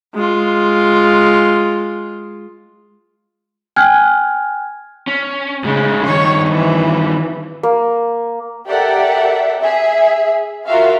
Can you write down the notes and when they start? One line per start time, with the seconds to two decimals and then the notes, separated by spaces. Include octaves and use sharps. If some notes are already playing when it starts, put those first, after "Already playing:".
0.15 G#3 F4
3.76 G5 G#5 F6 F#6 G#6
5.07 C#4
5.64 A2 C#3 G#3
6.07 G2 D#3 C#5
6.50 E3
7.63 A#3
8.67 G4 A4 A#4 D5 E5 F#5
9.61 G#4 E5
10.66 F4 F#4 A#4 E5 F5